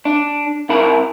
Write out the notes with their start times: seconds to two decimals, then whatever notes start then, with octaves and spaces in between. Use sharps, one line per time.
0.05 D4
0.69 C3 E4 A#4 B5